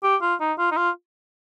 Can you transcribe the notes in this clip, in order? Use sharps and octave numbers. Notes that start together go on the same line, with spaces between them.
G4
F4
D#4
F4
D#4
F4